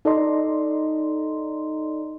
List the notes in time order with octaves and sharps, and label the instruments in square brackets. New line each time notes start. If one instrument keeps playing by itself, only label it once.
[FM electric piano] D#4 A4 D5 D#5 A#5 C6